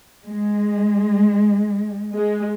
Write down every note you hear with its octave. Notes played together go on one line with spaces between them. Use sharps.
G#3
G#3